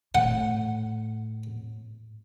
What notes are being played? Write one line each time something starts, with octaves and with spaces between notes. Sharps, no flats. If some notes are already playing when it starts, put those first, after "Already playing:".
A2 F#5